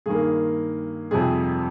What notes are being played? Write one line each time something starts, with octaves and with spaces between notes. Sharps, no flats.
G2 D#3 A#3 G#4
F2 C3 G3 G#4